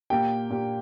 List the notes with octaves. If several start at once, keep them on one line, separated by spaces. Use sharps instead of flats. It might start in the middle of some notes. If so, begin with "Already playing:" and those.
A#2 A#3 G4 G5
A#2 A#3 G4